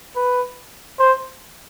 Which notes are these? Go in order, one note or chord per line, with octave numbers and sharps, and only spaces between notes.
B4
C5